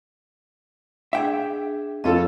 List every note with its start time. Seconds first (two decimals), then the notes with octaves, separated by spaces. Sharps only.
1.13 D4 G#4 E5 G5
2.04 F2 F4 A4 C#5 D#5